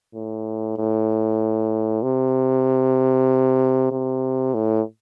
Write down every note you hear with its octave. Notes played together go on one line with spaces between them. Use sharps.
A2
A2
C3
C3
A2